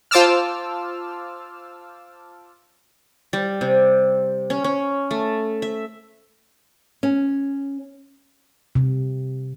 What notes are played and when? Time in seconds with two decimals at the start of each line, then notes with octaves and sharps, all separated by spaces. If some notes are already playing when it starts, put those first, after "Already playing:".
0.11 F4 C5 A5 D6 E6 F6
3.33 G3
3.61 C3
4.50 C#4
4.64 C#4
5.11 A3
5.62 E5
7.03 C#4
8.75 C3